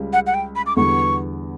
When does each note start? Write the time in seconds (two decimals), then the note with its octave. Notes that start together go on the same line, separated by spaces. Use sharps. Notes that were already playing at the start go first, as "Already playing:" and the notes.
Already playing: C#2 C#3 G3
0.13 F#5
0.27 F#5
0.34 G5
0.56 B5
0.66 D6
0.77 E2 D3 G3 B3 C#6